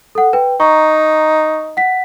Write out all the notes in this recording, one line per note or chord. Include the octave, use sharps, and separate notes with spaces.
A4 F#5
B4 G5
D#4 A#5 C#6
F#5 B6